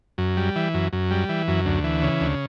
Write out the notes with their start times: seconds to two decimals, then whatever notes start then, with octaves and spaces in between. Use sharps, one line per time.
0.18 F#2
0.37 G3
0.56 E3
0.74 F#2
0.93 F#2
1.11 G3
1.29 E3
1.48 F#2
1.66 D2
1.84 E3
2.02 C#3
2.21 D2